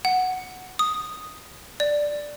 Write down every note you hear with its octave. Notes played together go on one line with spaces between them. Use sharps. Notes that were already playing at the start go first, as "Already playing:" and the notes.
F#5
D#6
D5